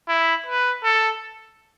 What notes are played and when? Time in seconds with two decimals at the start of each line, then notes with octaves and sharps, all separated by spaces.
0.08 E4
0.46 B4
0.84 A4